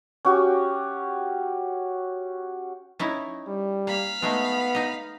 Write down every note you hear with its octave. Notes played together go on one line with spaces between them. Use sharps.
C#4 F#4 G4
C#4 D#4 E4
G3
A#3 F5 B5
G#3 A3 B3 D#4
D#4 D#5